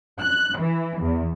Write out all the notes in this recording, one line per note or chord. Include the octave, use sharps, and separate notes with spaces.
F#6
E3
E2